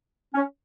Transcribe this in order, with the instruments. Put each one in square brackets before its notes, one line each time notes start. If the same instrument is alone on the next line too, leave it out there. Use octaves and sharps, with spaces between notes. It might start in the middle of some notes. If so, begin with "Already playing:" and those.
[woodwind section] C#4